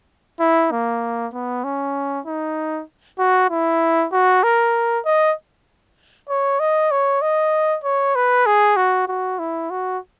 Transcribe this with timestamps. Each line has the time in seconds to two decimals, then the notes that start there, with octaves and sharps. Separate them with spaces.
0.40 E4
0.71 A#3
1.33 B3
1.64 C#4
2.26 D#4
3.19 F#4
3.50 E4
4.12 F#4
4.43 A#4
5.05 D#5
6.29 C#5
6.60 D#5
6.91 C#5
7.22 D#5
7.84 C#5
8.15 B4
8.46 G#4
8.77 F#4
9.08 F#4
9.39 E4
9.70 F#4